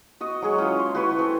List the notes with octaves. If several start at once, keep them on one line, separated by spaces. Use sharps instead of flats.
F#4 D#5
F#3 G#3 G#4 C#5
C#4 E4 F4
C6
F#4 B4 C#5
C4 A4